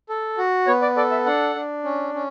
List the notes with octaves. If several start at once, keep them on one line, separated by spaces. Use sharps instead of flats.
A4
F#4
B3 C#5
D5
A4 D5
E5
D4 F#5
D4
C#4
C#4